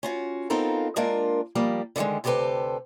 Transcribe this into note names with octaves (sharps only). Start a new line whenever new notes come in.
C#4 F4 F#4
B3 C4 D#4 F4 A4 A#4
G#3 A#3 D4 F4 A#4 F5
F3 G3 A#3
D3 D#3 F3 G3 G#3
D2 C3 G4 A4 B4 C5